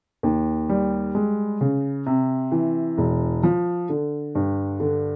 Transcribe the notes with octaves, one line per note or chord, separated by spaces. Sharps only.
D#2
G3
G#3
C#3
C3
E3
E1
F3
D3
G2
D3